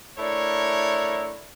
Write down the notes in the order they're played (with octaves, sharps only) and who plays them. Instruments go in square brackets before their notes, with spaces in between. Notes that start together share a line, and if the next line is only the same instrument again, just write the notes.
[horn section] A3 D4 E4 A#4 C#5